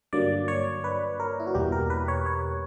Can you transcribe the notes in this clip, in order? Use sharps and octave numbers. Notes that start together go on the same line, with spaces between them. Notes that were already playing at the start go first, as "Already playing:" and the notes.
G2 D3 F#3 A#3 D5
C#5
B4
A#4
E4
F#4
E2 B2 G3 A#3 G4
A#4
B4
C#5
C#5